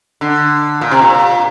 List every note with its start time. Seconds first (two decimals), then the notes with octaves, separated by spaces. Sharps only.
0.21 D3
0.81 A#2
0.91 C3
1.02 A#2